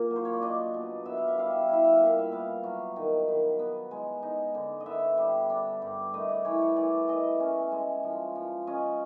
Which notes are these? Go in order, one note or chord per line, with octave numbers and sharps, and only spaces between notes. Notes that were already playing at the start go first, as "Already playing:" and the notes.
Already playing: A#2 A#3
F#3
C5
C#5
D5
D4 D#5
B2
B3 E5
F5
E5
G3 F5
E5
F5
E4 E5
F5
A#2 E5
F5
E5
B3 F5
F#3
D#3
D#3
B3
G#3
D#4
D3
D#5
B3 E5
G3
D4
G2
A3 D#5
D5
E3 C#5
C#5
E3 D5
E3 D#5
C#4
G#3
F3
F3
C#4 D#5